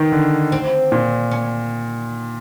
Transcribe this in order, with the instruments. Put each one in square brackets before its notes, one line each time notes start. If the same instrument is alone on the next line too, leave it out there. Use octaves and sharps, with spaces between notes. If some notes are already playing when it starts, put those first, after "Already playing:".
Already playing: [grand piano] D#3 [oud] B3
[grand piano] D3
[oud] C4
[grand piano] A#2
[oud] C#4